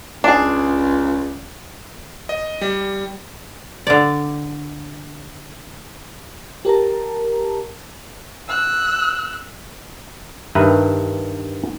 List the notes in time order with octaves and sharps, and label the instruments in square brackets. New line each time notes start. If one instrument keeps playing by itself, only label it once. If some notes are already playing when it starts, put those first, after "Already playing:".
[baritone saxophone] C#2 [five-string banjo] D4 G#4
[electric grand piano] D#5
G3
[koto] D3 D5
[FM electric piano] G4 A#4 A5 A#5
[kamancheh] E6 F#6
[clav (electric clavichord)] G2 D#3 B4 E5 A#5